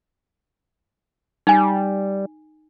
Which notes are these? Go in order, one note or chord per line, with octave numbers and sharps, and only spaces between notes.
G3 D#4 G#5